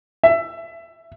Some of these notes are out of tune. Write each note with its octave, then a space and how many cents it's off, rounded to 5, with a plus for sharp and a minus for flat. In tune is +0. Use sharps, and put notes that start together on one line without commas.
E5 +20